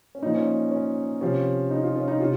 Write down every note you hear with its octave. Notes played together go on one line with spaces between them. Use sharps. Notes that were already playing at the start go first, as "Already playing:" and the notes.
C#4
A#2 F3 D#4
C#4
C#4
C3 F3 C#4
D#4
F4
C#4
D#4
C3 F4